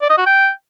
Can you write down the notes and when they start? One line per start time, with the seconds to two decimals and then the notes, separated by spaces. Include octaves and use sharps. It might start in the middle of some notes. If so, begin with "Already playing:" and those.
0.02 D5
0.10 D#5
0.18 F#4
0.26 G5